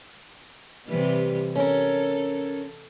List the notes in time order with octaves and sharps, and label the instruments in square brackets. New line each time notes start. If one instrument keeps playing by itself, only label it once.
[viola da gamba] C3 E3 G3
[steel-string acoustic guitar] C#4 A#4 [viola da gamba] A4